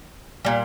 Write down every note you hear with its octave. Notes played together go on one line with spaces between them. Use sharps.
A#2 G3